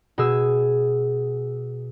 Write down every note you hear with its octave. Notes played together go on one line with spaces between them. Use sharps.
B2 G#4 E6